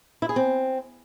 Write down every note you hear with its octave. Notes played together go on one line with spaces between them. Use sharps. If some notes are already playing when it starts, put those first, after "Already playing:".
E4
G#4
C4